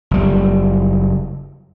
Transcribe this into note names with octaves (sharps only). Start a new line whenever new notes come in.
F#1 G3